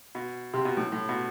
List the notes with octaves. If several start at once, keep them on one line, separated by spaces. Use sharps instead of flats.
B2
C3
B2
A2
A2
B2